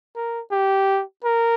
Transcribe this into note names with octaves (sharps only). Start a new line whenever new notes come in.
A#4
G4
A#4